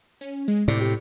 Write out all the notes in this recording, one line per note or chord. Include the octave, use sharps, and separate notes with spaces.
C#4
G#3
A2 C3 D5
G4